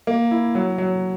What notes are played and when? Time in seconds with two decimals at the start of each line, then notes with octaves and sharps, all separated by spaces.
0.07 A#3
0.31 E4
0.55 F#3
0.78 F#3